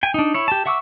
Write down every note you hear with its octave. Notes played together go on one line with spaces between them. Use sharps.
G5 G#5
D4 D#4
E4 C#5
G4 A5
E5 F#5 C#6 D6 E6